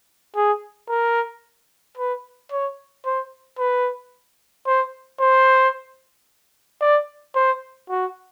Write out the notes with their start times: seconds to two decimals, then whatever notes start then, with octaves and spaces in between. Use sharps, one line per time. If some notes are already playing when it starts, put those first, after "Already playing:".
0.36 G#4
0.89 A#4
1.97 B4
2.51 C#5
3.05 C5
3.59 B4
4.67 C5
5.20 C5
6.81 D5
7.36 C5
7.89 F#4